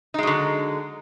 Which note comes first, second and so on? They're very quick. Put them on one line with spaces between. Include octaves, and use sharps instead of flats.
D#4 G#3 F#3 D3